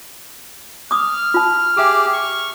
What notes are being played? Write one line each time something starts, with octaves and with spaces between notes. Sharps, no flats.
D6 D#6 F6
F4 A5
G4 G#4 E5 D6
C#6